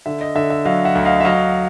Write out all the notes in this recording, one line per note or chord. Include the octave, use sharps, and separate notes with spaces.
D3 E5
D#5
D3 E5
E5
F#3 D#5 F5
E5 F#5
D2
D#5 F5
E5
F#3 D#5 F5